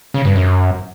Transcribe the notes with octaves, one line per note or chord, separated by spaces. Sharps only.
C#3
G2
F#2